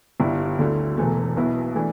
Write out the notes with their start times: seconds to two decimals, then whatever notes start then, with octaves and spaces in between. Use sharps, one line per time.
0.20 G1 G2 G3 E4
0.59 D2 D3 A3 E4
0.97 E1 E2 E3 A3
1.37 B1 B2 B3 E4
1.75 E3 A3 D4